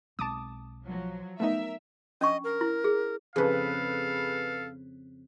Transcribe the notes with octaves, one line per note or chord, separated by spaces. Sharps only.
B1 G#3 C4 A5 D6 D#6
F3 F#3
A3 B3 D#4 A#4 E5
C#4 D4 D#5 C#6
A#4
E4
G#4
F2 C#3 G#4 A4 B4 F5